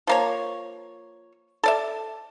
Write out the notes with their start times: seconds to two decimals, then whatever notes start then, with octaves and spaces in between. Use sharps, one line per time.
0.07 F3 A#3 C#5
1.63 A4 D5 E5